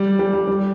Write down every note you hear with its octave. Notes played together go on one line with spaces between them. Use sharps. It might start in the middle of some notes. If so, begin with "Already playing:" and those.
Already playing: G3
G3
G3
G3